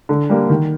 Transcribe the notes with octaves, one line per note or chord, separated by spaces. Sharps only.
D3
G3 A#3
D#3